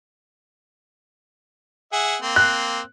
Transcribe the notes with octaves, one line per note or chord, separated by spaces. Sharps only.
G#4 E5 F#5
A#3 C4
F#6